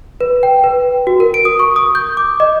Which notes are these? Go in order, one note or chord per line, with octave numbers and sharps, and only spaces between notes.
B4
G5
B4
F#4
A#4
D7
D#6
C#6
D#6
G6
D6
D#5